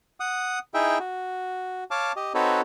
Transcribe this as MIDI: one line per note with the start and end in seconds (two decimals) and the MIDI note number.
0.20 0.59 78
0.20 0.59 87
0.74 0.98 63
0.74 0.98 64
0.74 0.98 68
0.74 0.98 76
0.74 0.98 79
0.99 1.84 66
1.91 2.12 73
1.91 2.12 77
1.91 2.12 81
1.91 2.12 86
2.16 2.33 67
2.16 2.33 75
2.34 2.61 60
2.34 2.61 63
2.34 2.61 66
2.34 2.61 69
2.34 2.61 71
2.34 2.61 73